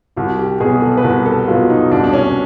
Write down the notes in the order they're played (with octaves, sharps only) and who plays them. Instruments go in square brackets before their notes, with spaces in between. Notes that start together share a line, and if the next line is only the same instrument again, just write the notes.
[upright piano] C2 [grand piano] F#4
[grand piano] G4
[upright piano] B2 F#3 [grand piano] G#4
[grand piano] A4
B4
[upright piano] C2 [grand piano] A#4
[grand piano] A4
[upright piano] B2 F#3 [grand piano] F4
[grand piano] D#4
[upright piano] C2 [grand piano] D4
[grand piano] D4
C#4